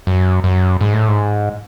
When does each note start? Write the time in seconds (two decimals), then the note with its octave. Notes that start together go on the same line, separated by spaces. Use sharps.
0.07 F#2
0.44 F#2
0.81 G#2
0.93 A2
1.08 G#2